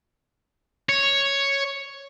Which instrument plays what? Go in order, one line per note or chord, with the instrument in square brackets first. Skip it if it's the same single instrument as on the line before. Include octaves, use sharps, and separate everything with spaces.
[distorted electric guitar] C#5